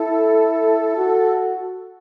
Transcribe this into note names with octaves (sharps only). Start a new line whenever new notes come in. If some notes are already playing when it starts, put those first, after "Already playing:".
Already playing: E4 A4
F#4